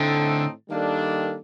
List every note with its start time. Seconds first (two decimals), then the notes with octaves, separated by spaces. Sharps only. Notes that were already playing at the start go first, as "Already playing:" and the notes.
Already playing: A2 D3 A3 C4 D#4 A4
0.69 D#3 G3 A#3 D4 A4